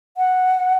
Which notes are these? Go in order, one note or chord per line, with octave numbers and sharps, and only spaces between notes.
F#5